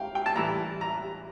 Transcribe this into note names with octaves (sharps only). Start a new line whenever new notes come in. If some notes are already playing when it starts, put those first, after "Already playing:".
Already playing: F5 G5
G5
A5
A2 E3 G3 A#5
A#5